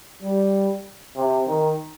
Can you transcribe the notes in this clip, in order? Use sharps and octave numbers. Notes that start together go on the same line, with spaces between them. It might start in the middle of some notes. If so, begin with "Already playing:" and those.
G3
C3
D#3